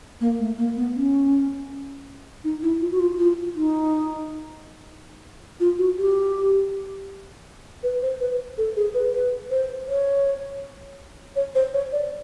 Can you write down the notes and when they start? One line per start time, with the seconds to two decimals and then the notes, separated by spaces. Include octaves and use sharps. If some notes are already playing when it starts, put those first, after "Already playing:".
0.21 A#3
0.39 A3
0.58 A#3
0.77 B3
0.95 C#4
2.44 D#4
2.63 E4
2.81 F4
2.92 F#4
3.00 F4
3.19 F4
3.56 D#4
5.60 F4
5.78 F#4
5.98 G4
7.83 B4
8.02 C5
8.20 B4
8.58 A4
8.76 G#4
8.94 B4
9.13 B4
9.50 C5
9.88 C#5
11.36 C#5
11.55 C5
11.73 C#5
11.92 D5